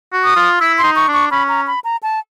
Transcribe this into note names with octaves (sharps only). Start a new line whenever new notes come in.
F#4
D#6
F4
E4 E6
C6
D#4
C#6
D4 C#6
C#4 B5
A#5
B5
A#5
A5